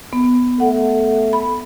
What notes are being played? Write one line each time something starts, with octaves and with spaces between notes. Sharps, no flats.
B3
A3 F#5
B5